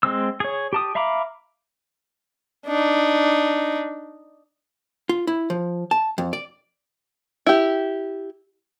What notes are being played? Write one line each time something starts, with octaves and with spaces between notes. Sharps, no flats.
G#3 C4 E6
G#4 C#5
G4 A5 D#6
E5 F5 A#5 B5 D6
D4 D#4
F4
E4
F3
A5
F2
D5
E4 G4